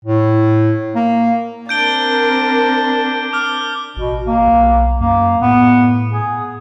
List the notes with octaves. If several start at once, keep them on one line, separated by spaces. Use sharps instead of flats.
A2
A#3
C4 D4 A#4 G6 D7 G7
D6 F6 G7
A1 B2
A#3
B1
F#2 A#3
A2 B3
G#4